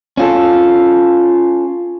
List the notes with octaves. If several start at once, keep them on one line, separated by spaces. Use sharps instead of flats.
C#4 F4 A4